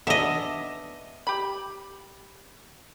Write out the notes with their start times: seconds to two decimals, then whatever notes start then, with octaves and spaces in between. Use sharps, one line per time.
0.07 B3 D4 D#5 E5
1.27 G4 B5